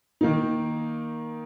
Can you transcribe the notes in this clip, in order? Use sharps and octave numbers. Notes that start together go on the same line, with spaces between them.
D#3 A#3 D#4